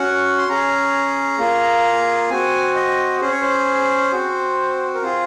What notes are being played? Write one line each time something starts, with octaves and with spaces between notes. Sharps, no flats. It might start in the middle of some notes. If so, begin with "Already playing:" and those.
Already playing: C#4 F#4 F#5
C6
C#4 G#4 A#5
A#3 F4 G#4
C4 F#4 G#5
D#5
C#4 G#4 C5
C#5
C5
C4 F#4
A#4
C4 F4 G#4 C5